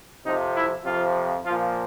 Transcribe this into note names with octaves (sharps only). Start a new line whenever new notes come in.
F2 C3 F3 D#4
E4
F2 C3 F3 F4
A#2 F3 F4